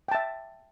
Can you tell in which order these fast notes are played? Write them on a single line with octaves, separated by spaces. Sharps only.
G5 A5 E5